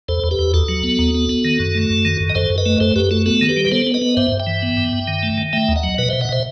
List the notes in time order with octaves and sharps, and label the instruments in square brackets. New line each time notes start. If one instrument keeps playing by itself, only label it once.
[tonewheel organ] E2 A4 C5
E2
G4 B4
E2
D#2 F#4 A4
F#3
B3
D#2
B3
B3
D#3
F#2
A3
F#2
D#3
F#2
D#5
F#2 A4 C5
F#2
B4 D#5
A3
F#2 A4 C5
F#2 G4 B4
A3 F#4 A4
B3 F#4 A4
D#3
G4 B4
G3
B4
B3 A4 C5
B3
B4 D#5
B3
G2 C5 E5
G2
E5 G5
E3
B3
G2
G2
D#3
A3
D#3
A3 E5 G5
D#2
D#5 F#5
F#3
B2 B4 D#5
B2 C5 E5
D#5 F#5
B2 C5 E5